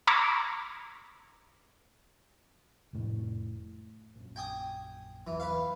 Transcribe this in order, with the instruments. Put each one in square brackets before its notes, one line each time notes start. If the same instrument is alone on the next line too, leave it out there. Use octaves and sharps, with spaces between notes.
[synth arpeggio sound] A#5 B5 C#6 D6 E6 G#6
[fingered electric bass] F1 A2
A#1 F#2
[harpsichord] G5 G#5 D#6
[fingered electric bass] G1 E2 F#3 [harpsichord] E3
[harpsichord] B4 F5